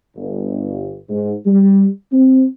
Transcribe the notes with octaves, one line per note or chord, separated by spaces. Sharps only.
G1
G#2
G3
C4